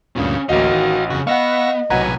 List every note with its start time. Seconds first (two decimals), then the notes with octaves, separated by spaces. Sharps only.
0.16 D2 G2 A#2 C#4 F5
0.49 A1 D2 A#3 F#4 D#5 F5 F#5
0.71 D#3
1.10 F2 C#3 F#4
1.27 B3 D#5 F5 F#5 C#6 E6 A#6
1.90 B1 A2 C3 F#3 B4 F#5 G#5 A#5